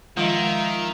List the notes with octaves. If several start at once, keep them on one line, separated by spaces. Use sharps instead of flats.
D#3 F3 G#3 F4 E5 A#5